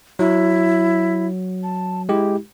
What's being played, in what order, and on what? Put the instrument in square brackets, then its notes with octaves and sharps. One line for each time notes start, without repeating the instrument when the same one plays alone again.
[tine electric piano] F#3 [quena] E4
[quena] A5
[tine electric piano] G#3 G4 [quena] E4